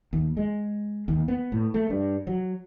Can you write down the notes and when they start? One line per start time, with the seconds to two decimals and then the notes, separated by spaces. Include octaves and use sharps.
0.13 D#2
0.37 G#3
1.08 D#2
1.28 B3
1.52 A2
1.74 A3
1.90 G2
2.27 F#3